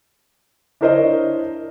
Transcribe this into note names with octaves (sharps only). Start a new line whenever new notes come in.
D4 E4 A#4 C5 C#5 D#5